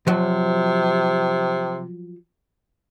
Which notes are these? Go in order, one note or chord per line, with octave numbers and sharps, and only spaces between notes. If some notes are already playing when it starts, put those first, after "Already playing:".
C3 F3 F#3